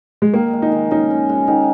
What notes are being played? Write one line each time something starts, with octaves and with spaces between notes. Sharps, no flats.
G#3
D#3 A#3
G#3
D#4
D#3
C#4 D#4
C#4
G#3
D#3 D#4